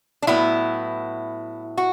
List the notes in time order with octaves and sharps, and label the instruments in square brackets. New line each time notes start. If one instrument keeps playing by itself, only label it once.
[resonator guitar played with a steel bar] D4
A2 F#3 B3 E4
F#4